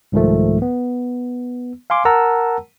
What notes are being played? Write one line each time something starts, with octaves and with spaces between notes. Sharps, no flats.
C2 G#2 D#3 F3 A3
B3
F5 G#5 C6 D6
A#4 F#5 A5 A#5 E6